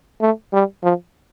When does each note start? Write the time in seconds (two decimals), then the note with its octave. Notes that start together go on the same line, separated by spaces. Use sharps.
0.21 A3
0.53 G3
0.83 F3